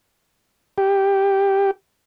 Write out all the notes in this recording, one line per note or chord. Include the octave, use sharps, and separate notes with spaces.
G4